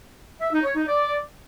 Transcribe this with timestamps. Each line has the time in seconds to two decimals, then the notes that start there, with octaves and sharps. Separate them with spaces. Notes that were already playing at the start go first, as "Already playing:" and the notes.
0.41 E5
0.53 D#4
0.64 C#5
0.76 D#4
0.87 D5